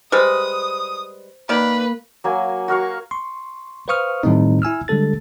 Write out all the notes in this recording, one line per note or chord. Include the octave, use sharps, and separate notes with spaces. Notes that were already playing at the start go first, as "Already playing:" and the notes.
G3 G#3 B4 C5 D#6
D#3 A#3 B4 D5
F#3 A#3 G#5
F#4 A#4 F5 C#6
C6 C#6
B4 C5 F5 C#6 D#6 F6
A2 D#3 G3 A3 C4 D#4
E4 G#5 E6 F6
D3 G3 G#3 A4 A6